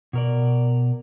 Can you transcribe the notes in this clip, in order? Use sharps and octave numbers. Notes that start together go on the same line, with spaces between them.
B2 A#4 D5